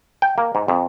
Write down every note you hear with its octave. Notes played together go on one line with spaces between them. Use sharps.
G5
A#3
G#2
F2